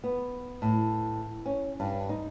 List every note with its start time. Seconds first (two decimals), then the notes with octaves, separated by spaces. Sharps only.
0.04 B3
0.62 A2
1.46 C#4
1.80 G2
2.09 D#4